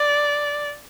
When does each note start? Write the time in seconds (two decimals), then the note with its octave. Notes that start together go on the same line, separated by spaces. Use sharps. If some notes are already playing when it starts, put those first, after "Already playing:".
Already playing: D5